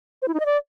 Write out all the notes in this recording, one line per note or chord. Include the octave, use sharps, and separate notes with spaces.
C5
E4
D#4
D#5
D5